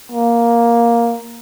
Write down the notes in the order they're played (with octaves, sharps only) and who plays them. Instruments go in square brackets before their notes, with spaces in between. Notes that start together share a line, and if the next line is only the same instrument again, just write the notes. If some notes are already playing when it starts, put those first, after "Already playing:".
[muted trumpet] A#3